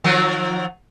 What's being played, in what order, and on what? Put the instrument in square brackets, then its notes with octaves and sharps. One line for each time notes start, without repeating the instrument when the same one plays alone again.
[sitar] D#3 F3 F#3